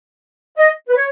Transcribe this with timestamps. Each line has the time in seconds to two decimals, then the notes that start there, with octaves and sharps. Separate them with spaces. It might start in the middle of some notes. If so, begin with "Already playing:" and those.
0.57 D#5
0.88 B4
0.96 C#5